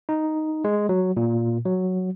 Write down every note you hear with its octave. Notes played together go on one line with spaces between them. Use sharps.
D#4
G#3
F#3
A#2
F#3